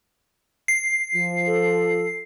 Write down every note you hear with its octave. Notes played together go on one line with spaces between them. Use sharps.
C7
F3
A4